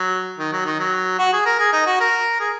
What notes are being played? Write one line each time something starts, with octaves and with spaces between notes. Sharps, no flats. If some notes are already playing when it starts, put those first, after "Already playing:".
Already playing: F#3
D#3
F#3
D#3
F#3
F#4
G#4
A#4
G#4
D#4
F#4
A#4
G#4